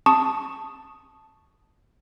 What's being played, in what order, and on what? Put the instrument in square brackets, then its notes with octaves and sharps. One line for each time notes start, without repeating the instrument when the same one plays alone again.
[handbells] A5 C#6 D#6